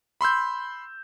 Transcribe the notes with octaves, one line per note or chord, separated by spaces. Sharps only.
B5 C6 E6 G6